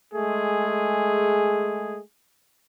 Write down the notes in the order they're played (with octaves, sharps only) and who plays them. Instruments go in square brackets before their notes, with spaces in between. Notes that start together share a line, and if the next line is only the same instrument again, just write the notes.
[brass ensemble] G#3 A3 G#4